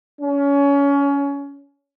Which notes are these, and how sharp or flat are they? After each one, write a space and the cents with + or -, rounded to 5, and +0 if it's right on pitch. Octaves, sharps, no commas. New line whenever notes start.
C#4 +25